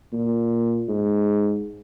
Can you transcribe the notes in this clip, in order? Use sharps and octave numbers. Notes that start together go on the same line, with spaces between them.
A#2
G#2